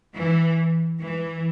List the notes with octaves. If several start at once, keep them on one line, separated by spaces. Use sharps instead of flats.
E3
E3